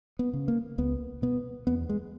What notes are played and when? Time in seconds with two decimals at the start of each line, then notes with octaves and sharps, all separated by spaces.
0.19 B3
0.33 C#3
0.48 A#3
0.78 C#2 B3
1.22 B2 B3
1.67 E2 B3
1.89 G#3